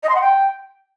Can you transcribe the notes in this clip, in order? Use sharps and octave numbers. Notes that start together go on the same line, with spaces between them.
D#5
C6
F#5
G5